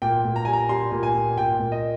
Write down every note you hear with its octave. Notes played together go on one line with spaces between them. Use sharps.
A#2 G5
A#2
A#5
G3 G#5
A#5
G3 C6
A#2
G#5
A#2
A#2 G5
A#2
D#5